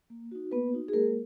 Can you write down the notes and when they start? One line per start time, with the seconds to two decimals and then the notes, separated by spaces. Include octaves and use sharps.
0.10 A#3
0.31 D#4 F#4
0.51 A#3 B3 B4
0.73 D#4 F#4
0.88 G#4
0.93 G#3 A#3 A#4